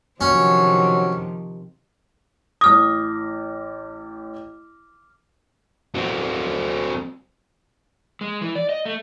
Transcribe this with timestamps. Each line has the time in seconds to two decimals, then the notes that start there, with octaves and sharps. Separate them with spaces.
0.21 C3 D#3 F3 F#3 C#4
2.61 A1 D6 D#6 F6 A#6
5.95 F#3 C4
8.21 G#3
8.41 E3
8.55 D5
8.69 D#5
8.86 A3